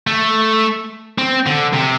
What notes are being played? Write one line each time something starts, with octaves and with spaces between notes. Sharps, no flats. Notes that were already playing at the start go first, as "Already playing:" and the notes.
A3
C4
D3
C3